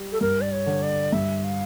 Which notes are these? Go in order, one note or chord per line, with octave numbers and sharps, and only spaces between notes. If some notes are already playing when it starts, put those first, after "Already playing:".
Already playing: G3
A4
G2 A#4
D5
C#5
D3
D5
G2 E5
F5